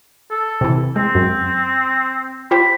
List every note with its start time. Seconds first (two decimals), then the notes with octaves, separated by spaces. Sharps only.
0.31 A4
0.61 C3 E3
0.96 G#3 C4
1.15 F#2
2.51 F4 G4 C5 B5